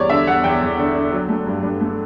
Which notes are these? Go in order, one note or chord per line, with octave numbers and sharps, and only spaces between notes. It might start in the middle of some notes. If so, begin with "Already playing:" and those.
Already playing: E2 G3 C#5 D5
D3 E5
E2 F#5
E2 G5
E2
D3
D3
F#3
A3
G2
G2
A3